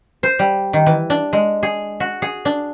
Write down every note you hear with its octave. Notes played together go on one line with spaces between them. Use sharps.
C5
G3
D#3
E3
D4
G#3
G#4
F#4
G#4
D4